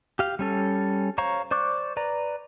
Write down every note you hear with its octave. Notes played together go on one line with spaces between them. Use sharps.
G4 F5
G3 C#4 A4
C5 C#5 F5 A#5 C#6
C5 D5 C#6 D6 F#6
B4 D5 A#5